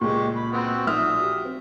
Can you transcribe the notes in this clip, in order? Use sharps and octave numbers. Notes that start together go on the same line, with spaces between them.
C#2 A#2 G#3 G4 C#6
B5
B3 C4 F#4
B1 F4 E5 D#6 F6
F#4 G4
C4